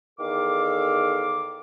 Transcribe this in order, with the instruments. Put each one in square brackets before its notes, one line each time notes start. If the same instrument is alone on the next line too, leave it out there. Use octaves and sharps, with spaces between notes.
[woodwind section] E2 D#3 A4 F5 D6